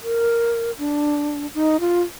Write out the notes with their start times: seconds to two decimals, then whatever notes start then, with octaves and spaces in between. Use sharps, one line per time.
0.03 A#4
0.79 D4
1.54 D#4
1.80 F4